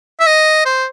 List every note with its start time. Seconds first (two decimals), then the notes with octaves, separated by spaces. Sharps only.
0.20 E5
0.27 D#5
0.66 C5